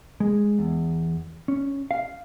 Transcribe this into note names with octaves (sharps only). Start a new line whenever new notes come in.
G#3
E2
C#4
F5